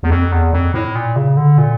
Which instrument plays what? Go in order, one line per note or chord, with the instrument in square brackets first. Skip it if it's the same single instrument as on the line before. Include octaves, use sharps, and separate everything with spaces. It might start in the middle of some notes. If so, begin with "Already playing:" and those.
[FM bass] E2
F2
E2
F2
A2
A#2
C#3
D3
A#2